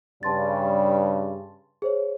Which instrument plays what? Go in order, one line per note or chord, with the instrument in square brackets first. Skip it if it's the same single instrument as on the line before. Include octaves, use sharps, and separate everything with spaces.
[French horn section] G2 C#3 G3 [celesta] A5 C6 A6
[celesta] G#4 C5 C#5